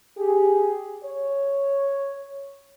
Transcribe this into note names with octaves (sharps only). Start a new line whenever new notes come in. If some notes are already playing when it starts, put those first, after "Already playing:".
G4 G#4
C#5